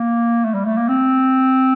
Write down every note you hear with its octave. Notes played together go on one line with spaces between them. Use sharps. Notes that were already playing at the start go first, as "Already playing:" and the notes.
Already playing: A#3
A3
G3
A3
A#3
C4